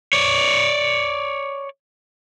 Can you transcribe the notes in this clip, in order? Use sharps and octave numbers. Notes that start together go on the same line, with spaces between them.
C#5 D5